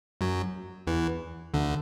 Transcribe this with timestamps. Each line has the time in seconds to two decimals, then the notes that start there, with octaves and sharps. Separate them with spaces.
0.21 F#2 F#3
0.87 E2 E3
1.54 D2 D3